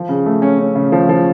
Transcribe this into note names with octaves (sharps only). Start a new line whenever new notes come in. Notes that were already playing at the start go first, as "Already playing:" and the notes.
Already playing: F3
C#3
A3
C#4
C#4
C#3
F3
F3